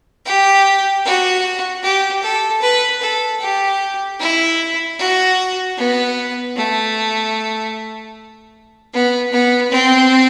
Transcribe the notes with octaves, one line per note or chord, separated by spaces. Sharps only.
G4
F#4
G4
A4
B4
A4
G4
E4
F#4
B3
A3
B3
B3
C4